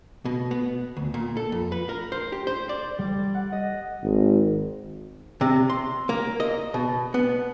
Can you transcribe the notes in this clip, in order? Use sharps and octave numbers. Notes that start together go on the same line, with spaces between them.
B2
B3
D2
A#2
A4
F2
B4
A#4
C5
G4
C5
D5
G3
F#5
D#5
G#1
C3
C6
A#3
D#5
B2
B3